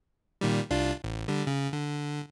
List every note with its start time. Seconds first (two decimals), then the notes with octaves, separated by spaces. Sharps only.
0.41 A#2 D#3 G3
0.70 C2 D4 F4
1.04 A1
1.28 D3 G3
1.47 C#3
1.73 D3